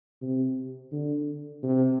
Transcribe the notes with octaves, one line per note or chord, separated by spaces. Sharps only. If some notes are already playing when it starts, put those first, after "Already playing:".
C3
D3
C3